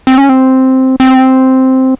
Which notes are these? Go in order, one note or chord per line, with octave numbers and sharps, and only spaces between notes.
C4
C#4
C4
C4